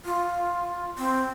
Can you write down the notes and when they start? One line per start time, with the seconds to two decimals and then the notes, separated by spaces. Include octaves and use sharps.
0.05 F4
0.98 C4